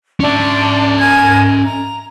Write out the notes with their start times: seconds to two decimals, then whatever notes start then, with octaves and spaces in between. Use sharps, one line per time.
0.20 C#4 D4 E5
0.98 A#4 G#5 G#6
1.64 A#5